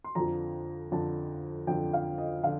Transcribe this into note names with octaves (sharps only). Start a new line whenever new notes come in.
C6
F2 D3 F3 A#5
F2 D3 F3 A5
F2 D3 F3 G5
F5
D#5
D3 F3 F5